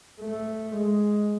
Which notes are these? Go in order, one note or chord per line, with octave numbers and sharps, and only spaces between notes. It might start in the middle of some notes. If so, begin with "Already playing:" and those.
A3
G#3